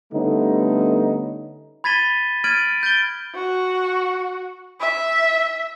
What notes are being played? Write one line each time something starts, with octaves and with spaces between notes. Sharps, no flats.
D3 G3 A3 B3 C#4 D#4
B5 G#6 A6 B6 D#7 G7
F6 G#6 A6 D7 D#7 F#7
G6 A6 D7 G7
F#4
E5